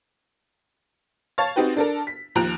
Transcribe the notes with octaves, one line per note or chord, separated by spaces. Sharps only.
C#5 F5 A5 C#6 A6
C4 D#4 F#4 G4 B4
D4 A4 A#4
B6
D#2 F3 A#5 F#6 D7